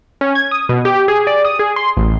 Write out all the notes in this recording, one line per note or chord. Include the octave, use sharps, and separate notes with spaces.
C#4
G#6
D#6
B2
G4
G#4
D5
D#6
G#4
C6
A1